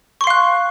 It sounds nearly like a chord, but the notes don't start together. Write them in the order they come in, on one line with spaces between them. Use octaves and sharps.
C#6 C6 F5 F#6